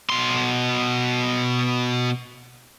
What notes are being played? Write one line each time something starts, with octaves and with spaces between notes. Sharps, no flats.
B2 C6